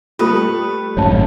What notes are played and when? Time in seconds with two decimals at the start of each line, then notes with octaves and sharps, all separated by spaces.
0.19 G3 A3 F4 B4 D#6
0.97 G#1 F#2 A2 C#5 A5